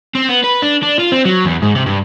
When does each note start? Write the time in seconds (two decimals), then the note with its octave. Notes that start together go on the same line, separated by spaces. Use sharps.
0.15 C4
0.29 B3
0.44 B4
0.63 D4
0.83 D4
0.99 F4
1.12 C4
1.25 F#3
1.45 E2
1.62 G#2
1.75 C3
1.86 G2